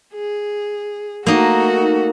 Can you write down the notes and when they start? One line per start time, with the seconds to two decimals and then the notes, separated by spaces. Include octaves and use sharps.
0.15 G#4
1.26 A3 A#3 D#4 F#4